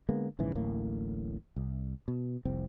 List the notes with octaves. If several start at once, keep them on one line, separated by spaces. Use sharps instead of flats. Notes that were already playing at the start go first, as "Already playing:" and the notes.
D3 G#3 A#3 B3
A#1 G#2 C#3 E3
D1 A1 A2 A#3
C2
B2
F1 C2 C4